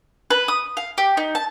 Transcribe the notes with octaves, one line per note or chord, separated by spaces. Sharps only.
B4
D#6
F5
G4
D#4
A5